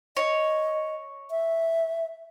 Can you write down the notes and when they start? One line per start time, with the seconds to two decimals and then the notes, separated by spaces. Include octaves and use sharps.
0.17 C#5 D#5
1.30 E5